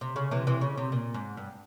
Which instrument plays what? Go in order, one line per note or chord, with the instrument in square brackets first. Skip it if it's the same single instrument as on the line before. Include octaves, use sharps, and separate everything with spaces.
[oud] C3
C#3
C3 E3
C3 E3
C#3
C3
A#2
G#2
G2